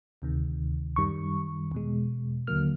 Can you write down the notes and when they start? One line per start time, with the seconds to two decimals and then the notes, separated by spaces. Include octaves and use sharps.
0.22 D2 C3 D#3
0.96 F#2 D#3 G3 C#6
1.72 E2 B2 G#3
2.47 D#2 D3 F#3 A#3 F6